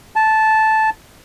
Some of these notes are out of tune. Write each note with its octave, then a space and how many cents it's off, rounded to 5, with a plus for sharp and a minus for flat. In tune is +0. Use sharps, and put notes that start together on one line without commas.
A5 -10